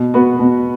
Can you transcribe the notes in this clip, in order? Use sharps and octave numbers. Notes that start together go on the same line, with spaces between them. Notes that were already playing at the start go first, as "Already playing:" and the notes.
Already playing: B2
B3 F#4 B4
B2